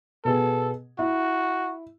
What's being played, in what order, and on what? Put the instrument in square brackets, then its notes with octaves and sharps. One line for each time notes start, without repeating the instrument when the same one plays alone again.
[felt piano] B2 B3 G#4 [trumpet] A4
[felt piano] E4 [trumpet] F#4